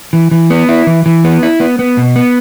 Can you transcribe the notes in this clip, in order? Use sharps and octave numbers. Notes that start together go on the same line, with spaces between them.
E3
E3
B3
E4
E3
E3
B3
E4
B3
B3
B2
B3